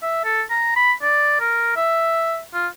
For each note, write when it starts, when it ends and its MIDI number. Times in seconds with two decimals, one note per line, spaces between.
0.03 0.23 76
0.24 0.42 69
0.50 0.73 82
0.76 0.93 83
1.02 1.38 74
1.40 1.72 70
1.76 2.41 76
2.54 2.68 65